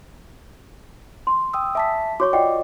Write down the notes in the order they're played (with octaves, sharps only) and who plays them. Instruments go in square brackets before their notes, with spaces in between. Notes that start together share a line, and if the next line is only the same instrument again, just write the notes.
[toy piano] C6
[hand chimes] G5 D#6 E6
[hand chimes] E5 A5 B6 [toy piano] G#5 D6
[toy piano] F#4 C#5 C#6 [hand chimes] D6
[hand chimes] F4 D#5 [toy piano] D5 F#5 G5